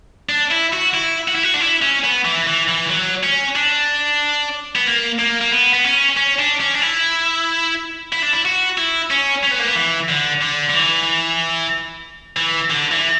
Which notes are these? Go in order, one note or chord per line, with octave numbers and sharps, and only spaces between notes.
D4
E4
F#4
E4
F#4
E4
F#4
D4
E4
C#4
B3
E3
E3
E3
F#3
C#4
D4
B3
A#3
A#3
A#3
B3
B3
C#4
C#4
D4
C#4
D4
E4
E4
D4
E4
F#4
E4
C#4
C#4
B3
A#3
B3
E3
D3
D3
D3
E3
E3
D3
E3